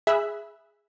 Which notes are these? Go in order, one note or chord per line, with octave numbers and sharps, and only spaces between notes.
G#4 E5 B5 E6 F#6